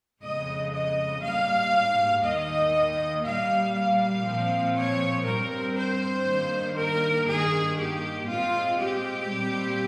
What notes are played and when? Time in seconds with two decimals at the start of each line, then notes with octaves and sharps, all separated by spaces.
0.22 F2 C#3 G#3 D#5
0.73 D#5
1.23 G#2 G3 A#3 F5
2.23 D#2 D#3 A#3 D#5
3.24 A#2 G3 A#3 F5
3.75 F5
4.25 A#2 F3 C4
4.76 C#5
5.25 G2 G3 C4 A#4
5.76 C5
6.27 G2 D#3 A#3
6.77 A#4
7.27 G2 D#3 A#3 G#4
7.78 G4
8.28 A#2 G#3 C4 F4
8.79 G4
9.29 A#2 G3 C4